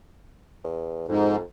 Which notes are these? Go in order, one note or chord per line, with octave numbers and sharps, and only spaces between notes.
E2
F2 G#2